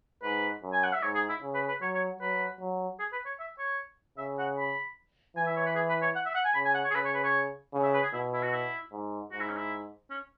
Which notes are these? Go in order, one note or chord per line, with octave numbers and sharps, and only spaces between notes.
G#2 B4
F#2
G#5
F#5
E5
G#2 C#5
G#4
E4
C#3
B4
B4
F#3 C#5
C#5
F#3 B4
F#3
G#4
B4
C#5
E5
C#5
C#3 E5
F#5
B5
E3 G#5
E5
C#5
B4
G#4
B4
C#5
F#5
E5
F#5
G#5
C#3 B5
G#5
F#5
C#5
G#4
C#3 B4
C#5
B4
C#5
C#3
E5
B4
G#4
B2 E4
E4
F#4
E4
G#2
G#2 F#4
E4
C#4
E4
C#4